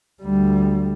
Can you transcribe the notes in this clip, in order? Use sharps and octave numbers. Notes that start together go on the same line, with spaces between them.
D2 G3